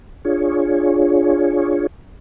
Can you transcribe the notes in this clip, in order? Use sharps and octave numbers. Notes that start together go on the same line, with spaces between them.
D4 F4 G#4 C#5